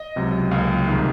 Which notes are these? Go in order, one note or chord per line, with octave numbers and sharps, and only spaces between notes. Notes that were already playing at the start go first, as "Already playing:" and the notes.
Already playing: D#5
C#2 C3 F#3
C#2 C#3 F#3 A#3 F5
C2 C3 D#3 G#3